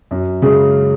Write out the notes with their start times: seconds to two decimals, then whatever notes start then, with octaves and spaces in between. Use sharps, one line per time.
0.11 F#2
0.42 C#3 G#3 C#4